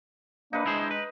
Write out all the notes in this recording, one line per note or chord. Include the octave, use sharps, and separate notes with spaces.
A#3 D4 D#4 B4
G#3 D4 E4 G#4 C5
B4